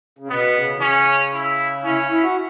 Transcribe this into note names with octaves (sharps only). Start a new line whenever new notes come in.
C#3
B2 B3
C#3
E3
C#3 C#4
E4
C#4 E4
E4
F#4